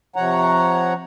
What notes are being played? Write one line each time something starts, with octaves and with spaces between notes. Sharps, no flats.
C3 F3 C#5 F#5 A#5